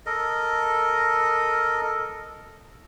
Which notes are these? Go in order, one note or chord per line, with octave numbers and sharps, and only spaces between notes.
A4 A#4 D#5